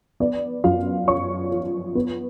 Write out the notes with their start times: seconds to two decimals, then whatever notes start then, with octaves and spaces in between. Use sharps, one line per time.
0.20 B3 D5
0.64 F#2 F4 F5
1.08 F3 C#5 C#6
1.52 F3
1.95 B3